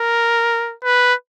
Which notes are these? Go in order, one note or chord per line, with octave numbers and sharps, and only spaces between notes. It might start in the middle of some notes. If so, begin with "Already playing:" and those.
Already playing: A#4
B4